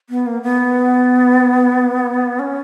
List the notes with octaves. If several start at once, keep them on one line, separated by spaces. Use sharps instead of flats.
B3
A#3
B3
C#4